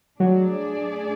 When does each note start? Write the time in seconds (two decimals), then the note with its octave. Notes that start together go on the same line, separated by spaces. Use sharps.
0.20 F#3 A3 D4 G#4 D5